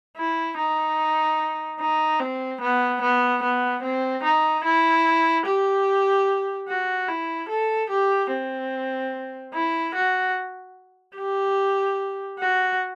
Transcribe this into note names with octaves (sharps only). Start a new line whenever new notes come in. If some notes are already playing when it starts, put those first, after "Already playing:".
E4
D#4
D#4
C4
B3
B3
B3
C4
D#4
E4
G4
F#4
E4
A4
G4
C4
E4
F#4
G4
F#4